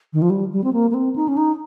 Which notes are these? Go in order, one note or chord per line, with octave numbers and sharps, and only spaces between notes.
D#3
F3
G3
G3
C4
A#3
A#3
C4
D#4
C#4
D#4